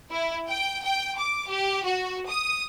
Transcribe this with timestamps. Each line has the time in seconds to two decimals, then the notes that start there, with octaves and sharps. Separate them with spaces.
0.11 E4
0.48 G5
0.84 G5
1.18 D6
1.50 G4
1.84 F#4
2.28 D#6